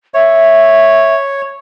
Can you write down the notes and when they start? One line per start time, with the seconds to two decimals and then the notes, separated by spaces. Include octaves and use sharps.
0.14 C#5 E5